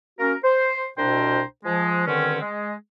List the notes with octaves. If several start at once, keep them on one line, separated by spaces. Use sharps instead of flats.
A#3 C#4 F#4 A#4
C5
C2 B2 D4 C5 G5 A#5
F3 G#3
G2 D3 D#3 C4 C#4
G#3